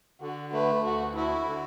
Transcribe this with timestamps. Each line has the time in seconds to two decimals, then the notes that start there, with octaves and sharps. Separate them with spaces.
0.21 D3 F#4
0.52 A3 B4
0.84 D2 F#4
1.16 E4 F#4
1.48 D3